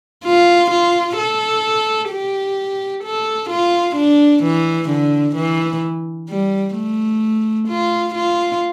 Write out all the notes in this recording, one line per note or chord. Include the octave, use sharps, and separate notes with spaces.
F4
F4
A4
G4
A4
F4
D4
E3
D3
E3
G3
A3
F4
F4